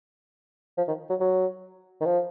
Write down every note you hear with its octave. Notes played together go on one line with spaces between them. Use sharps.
F3
D#3
F#3
F#3
D#3
F3